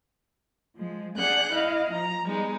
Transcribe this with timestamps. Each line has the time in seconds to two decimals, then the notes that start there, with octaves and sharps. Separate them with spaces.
0.76 F3 G#3
1.18 D4 G#4 F#5 F#6 G6
1.54 E4 D#5 F5
1.91 F3 A#5
2.27 G3 G#3 B3 D#4